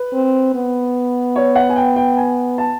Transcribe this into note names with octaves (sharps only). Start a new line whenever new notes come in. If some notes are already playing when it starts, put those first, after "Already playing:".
Already playing: B4
C4
B3
C#5
F#5
G#5
G5
G5
G#5
A5